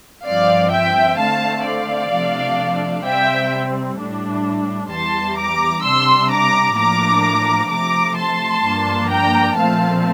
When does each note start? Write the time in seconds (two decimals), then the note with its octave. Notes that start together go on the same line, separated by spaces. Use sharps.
0.25 G2 F3 C4 D5 F5
0.71 E5 G5
1.18 D3 A3 C4 F5 A5
1.65 D5 F5
2.11 C3 F3 A3 D4
3.04 C3 G3 C4 E5 G5
3.98 A2 G3 D4
4.91 E2 E3 G3 A5 C6
5.38 A#5 D6
5.84 C3 G3 D4 C6 E6
6.31 A#5 D6
6.77 A2 F3 A#3 D4 A#5 D6
7.70 C3 F3 A3 A#5 D6
8.17 A5 C6
8.64 G2 F3 A#3 D4
9.10 G5 A#5
9.57 A#2 F3 A3 C4 F5 A5